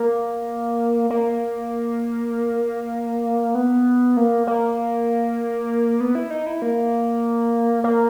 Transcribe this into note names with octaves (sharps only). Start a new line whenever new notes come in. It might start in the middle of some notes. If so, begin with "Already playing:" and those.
Already playing: A#3
A#3
B3
A#3
A#3
B3
E4
D#4
E4
A#3
A#3